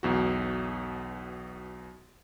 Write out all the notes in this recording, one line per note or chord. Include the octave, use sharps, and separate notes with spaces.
B1 E2 F#4